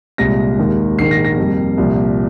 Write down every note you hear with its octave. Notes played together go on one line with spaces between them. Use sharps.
C2 A#2 G#3 A#6
D#2 D#3 G#3
A#1 G#2 D#3 C7
A#6
A#6
F2 C3 G3 A#3
C2 A#2 F3